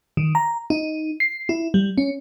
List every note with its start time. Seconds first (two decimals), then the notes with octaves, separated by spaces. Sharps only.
0.17 D#3
0.35 A#5
0.70 D#4
1.20 C7
1.49 E4
1.74 G3
1.98 C#4